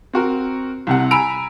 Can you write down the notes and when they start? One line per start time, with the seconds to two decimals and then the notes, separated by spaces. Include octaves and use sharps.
0.13 C4 F#4 A#4
0.87 C2 C3 F#5
1.11 G#5 A#5 B5 E6 D7 F7